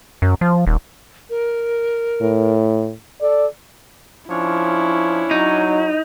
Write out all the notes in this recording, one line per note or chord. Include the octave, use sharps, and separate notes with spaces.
F#2
F3
D#1
A#4
A2
A4 D5
F3 C#4 D4 E4 C#5
F#3 D#4